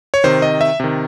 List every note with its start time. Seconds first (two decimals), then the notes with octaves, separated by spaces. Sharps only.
0.14 C#5
0.24 C3 D#3 C5
0.42 D#5
0.61 E5
0.80 C3 D#3